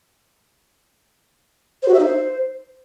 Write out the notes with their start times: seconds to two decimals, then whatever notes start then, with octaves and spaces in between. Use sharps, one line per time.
1.83 C5
1.88 F#4
1.94 E5
1.99 D#4
2.05 C5